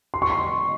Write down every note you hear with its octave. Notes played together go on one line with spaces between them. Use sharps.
C6
C#6
C6